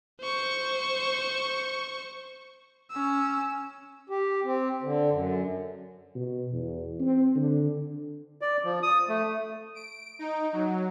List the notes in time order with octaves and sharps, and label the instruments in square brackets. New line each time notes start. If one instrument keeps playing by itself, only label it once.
[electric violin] C5 C#6
C#4 E6
[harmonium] G4
C4
D3
F#2
[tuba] B2
E2
C4
D3
[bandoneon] D5
F3
D#6
A3
[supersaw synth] D7
D#4
F#3